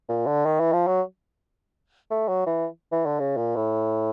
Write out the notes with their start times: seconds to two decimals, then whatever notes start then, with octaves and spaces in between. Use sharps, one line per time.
0.09 A#2
0.27 D3
0.46 D#3
0.59 E3
0.73 F3
0.87 F#3
2.10 A3
2.28 F#3
2.46 E3
2.92 E3
3.06 D3
3.19 C#3
3.37 A#2
3.56 A2